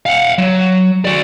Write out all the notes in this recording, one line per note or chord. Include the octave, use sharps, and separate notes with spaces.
F5 F#5
F#3
F#4 D5